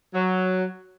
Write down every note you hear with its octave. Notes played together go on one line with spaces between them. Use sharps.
F#3